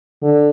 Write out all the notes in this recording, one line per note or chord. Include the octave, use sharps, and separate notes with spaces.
D3